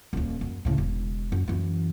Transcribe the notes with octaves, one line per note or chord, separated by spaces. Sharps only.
D#1 D#2
F#2
A2 C#3
E1
F#2
F#2 E3